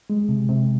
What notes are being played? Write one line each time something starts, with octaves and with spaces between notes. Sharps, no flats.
G#3
C3
C3